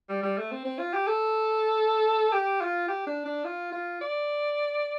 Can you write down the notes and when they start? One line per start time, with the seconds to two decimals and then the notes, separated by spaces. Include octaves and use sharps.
0.09 G3
0.23 G3
0.38 A3
0.51 C4
0.65 C4
0.79 F4
0.93 G4
1.07 A4
2.32 G4
2.61 F4
2.88 G4
3.07 D4
3.25 D4
3.45 F4
3.72 F4
4.01 D5